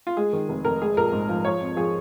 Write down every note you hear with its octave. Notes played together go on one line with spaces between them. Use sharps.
F4
G#3 G#4
D#3
F1
F1 A#4
G#3 G#4
A#1 A#4
G#2
F3
F3 C#5
F2
F3 G#4